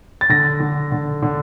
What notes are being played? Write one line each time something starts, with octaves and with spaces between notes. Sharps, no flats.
A6
D3 A#6
D3
D3
D3